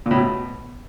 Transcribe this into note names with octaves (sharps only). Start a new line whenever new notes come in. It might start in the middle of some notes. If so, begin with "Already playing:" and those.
A#2
A2
B2